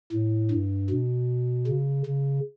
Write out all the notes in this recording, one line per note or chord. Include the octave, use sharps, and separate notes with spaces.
A2
G2
B2
C#3
C#3